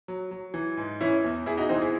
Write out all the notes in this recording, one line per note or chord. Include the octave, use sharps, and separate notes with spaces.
F#3
F#3
E3
G#2
E3 C#4 E4
E2
E2 E4 G#4
D#4 F#4
E3 C4 D#4
E4 G#4